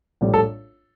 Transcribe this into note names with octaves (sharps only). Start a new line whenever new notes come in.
A#1 A2 G3
A4